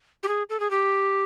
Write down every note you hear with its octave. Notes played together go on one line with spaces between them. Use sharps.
G4
G#4
A4
G#4
G4